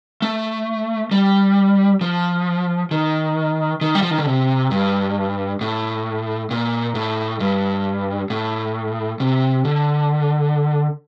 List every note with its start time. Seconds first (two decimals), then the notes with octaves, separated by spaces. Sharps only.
0.22 A3
1.11 G3
2.01 F3
2.91 D#3
3.81 D#3
3.95 G3
4.02 F3
4.11 D#3
4.19 D3
4.26 C3
4.71 G2
5.61 A2
6.51 A#2
6.95 A2
7.40 G2
8.30 A2
9.20 C3
9.65 D3